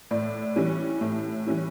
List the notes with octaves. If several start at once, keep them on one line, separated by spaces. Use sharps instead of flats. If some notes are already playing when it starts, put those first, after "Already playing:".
A2 D5
E3 G3 C#4 E4
A2
E3 G3 C#4 E4